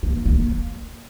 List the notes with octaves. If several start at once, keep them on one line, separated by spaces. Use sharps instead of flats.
A#3
A#3